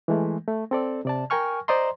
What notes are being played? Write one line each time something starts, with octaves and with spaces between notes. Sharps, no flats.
E3 G#3 A3
A3
C4 A4 D5
C3 D5 A5
A#4 G5 G#5 C#6 F6
C5 D5 D#5 A#5 C6